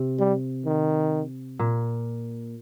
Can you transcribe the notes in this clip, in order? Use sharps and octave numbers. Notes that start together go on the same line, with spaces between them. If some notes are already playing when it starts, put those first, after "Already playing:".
Already playing: C3
G3
D#3
A#2